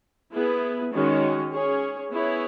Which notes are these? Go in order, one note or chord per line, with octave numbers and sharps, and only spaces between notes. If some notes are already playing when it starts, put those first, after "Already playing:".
B3 E4 G#4
D#3 G#3 C#4 F#4 C#5
C#4 G#4 C#5
B3 E4 G#4 C#5